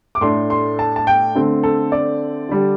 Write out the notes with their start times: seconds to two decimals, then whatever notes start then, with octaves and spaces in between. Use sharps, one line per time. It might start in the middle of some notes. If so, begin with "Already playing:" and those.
0.15 D6
0.21 A2 A3 D4 C6
0.50 C6
0.79 A5
0.96 A5
1.07 G5
1.35 D3 A3 C4
1.63 A4
1.92 D5
2.49 D3 G3 D4